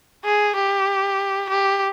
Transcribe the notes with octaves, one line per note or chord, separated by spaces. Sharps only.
G#4
G4
G4